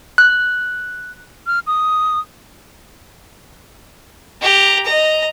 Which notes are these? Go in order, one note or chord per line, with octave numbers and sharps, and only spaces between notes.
F#6
F6
D#6
G4 A#5
D#5 A#5